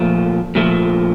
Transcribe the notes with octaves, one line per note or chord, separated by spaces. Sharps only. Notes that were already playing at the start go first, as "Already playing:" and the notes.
Already playing: A#2 F3 A3
A#2 F3 A3